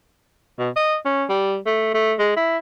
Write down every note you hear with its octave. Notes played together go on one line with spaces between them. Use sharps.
B2
D#5
C#4
G3
A3
A3
G#3
E4